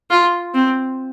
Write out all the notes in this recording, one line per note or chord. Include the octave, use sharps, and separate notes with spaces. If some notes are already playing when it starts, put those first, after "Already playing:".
F4
C4